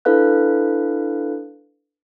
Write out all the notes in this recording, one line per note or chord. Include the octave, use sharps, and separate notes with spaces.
D4 E4 A4 B4 F5 F#6